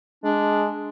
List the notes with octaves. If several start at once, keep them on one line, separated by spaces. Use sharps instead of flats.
G#3 D4